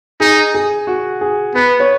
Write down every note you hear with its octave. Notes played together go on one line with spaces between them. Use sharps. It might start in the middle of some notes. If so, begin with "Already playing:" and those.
D#4 G#4
G#4
F#4
G#4
B3 B4
C#5